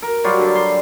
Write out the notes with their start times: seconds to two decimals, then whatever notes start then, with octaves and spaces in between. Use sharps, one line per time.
0.02 A#4
0.24 F#3 G3 F4
0.39 D3
0.55 C6